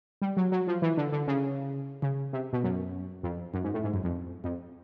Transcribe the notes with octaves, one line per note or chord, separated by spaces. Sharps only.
G3
F#3
F#3
F3
E3
D3
D3
C#3
C#3
C3
B2
F#2
F2
F#2
G#2
A2
G#2
F#2
F2
F2